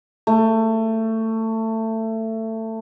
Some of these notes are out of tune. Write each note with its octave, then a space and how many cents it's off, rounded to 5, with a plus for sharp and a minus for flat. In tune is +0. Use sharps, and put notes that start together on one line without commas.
A3 +20